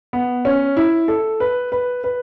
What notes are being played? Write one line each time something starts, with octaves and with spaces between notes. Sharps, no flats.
B3
C#4
E4
A4
B4
B4
B4